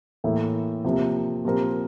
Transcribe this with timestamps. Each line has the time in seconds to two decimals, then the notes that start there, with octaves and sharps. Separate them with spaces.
0.24 A2 E3 A#3 E4
0.84 C3 F3 A#3
1.45 A#2 F3 C4 G4 A#4